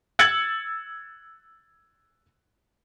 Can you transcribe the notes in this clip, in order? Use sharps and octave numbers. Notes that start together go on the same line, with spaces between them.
E6 G#6 A6 C#7 F#7